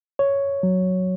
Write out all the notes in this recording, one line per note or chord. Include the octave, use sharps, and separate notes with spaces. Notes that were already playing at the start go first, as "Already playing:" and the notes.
C#5
F#3